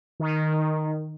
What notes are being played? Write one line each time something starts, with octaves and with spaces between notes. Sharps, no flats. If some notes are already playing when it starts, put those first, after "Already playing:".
D#3